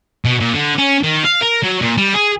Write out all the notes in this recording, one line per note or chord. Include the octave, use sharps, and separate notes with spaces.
B2
A#2
D3
C#4
D#3
F5
A#4
F#3
A#2
G3
G#4